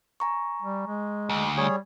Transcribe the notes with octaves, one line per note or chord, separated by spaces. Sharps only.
G#5 A#5 C#6
G3
G#3
D2
G3 G#4 C#5